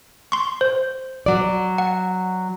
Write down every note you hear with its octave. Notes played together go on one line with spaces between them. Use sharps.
C6 C#6
C5
F#3 D5
F#5